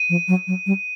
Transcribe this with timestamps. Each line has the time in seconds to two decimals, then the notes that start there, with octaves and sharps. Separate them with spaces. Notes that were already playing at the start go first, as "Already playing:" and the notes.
Already playing: D#7
0.10 F3
0.28 F#3
0.47 F#3
0.66 G3